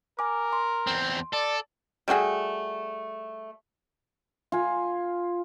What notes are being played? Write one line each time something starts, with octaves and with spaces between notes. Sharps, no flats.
A#4 G#5 D6
C6
E2 C4
A4 D5
G3 A3 F#4 G#4
F4 G#5